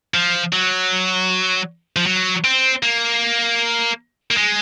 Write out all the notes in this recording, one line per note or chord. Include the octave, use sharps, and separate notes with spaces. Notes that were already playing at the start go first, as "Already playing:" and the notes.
F3
F#3
F3
F#3
C4
A#3
A#3
G#3